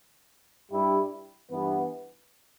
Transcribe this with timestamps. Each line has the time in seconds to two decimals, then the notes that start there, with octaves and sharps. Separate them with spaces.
0.70 G2 G3 E4 G4
1.50 G2 E3 B3